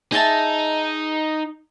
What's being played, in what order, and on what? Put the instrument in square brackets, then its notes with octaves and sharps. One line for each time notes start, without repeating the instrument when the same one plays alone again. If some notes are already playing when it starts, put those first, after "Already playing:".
[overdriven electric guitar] D#4 [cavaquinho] G#4 E5 A5